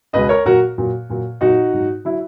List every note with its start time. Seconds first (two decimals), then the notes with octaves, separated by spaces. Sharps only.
0.13 C#2 B2 G#3 B4 D#5
0.29 A#4 C#5
0.45 A#2 F#3 F#4 A#4
0.78 A#2 F#3
1.10 A#2 F#3
1.41 A#2 F#3 D#4 F#4
1.73 G#2 F#3
2.05 F#3 E4